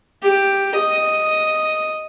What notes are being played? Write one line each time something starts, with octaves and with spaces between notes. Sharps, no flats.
G4
D#5